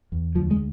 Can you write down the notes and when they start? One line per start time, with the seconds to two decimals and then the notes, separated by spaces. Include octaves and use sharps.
0.12 E2
0.35 D2 F3
0.51 G#3